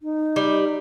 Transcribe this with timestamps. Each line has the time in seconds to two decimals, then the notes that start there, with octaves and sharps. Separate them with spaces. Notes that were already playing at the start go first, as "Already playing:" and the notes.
0.01 D#4
0.36 G3